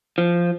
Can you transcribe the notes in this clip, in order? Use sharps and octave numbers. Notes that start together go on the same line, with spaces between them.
F3